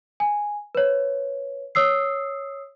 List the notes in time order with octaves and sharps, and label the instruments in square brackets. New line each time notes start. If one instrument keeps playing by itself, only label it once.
[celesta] G#5
B4 C#5
C#5 D#6 E6 C7